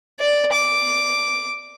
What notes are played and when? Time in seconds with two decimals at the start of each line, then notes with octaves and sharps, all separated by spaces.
0.20 D5
0.53 D6